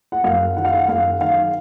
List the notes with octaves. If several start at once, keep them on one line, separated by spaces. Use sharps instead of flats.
F#5
F#2 F5
D#3 F#5
F5
F#5
F#2 F5
D#3 F5